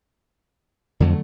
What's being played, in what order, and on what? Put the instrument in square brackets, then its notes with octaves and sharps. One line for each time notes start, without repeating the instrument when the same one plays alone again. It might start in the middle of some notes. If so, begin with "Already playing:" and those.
[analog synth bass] F2 [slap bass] D3 F#3 A3